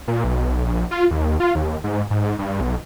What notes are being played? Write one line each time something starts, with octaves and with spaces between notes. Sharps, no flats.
A#2
B1
A#1
F4
D#2
F4
D#2
G#2
G#2
G2
B1